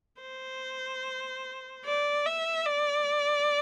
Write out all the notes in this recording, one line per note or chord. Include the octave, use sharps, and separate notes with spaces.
C5
D5
E5
D5